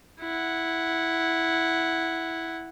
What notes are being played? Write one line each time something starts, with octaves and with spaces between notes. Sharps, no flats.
E4 F#5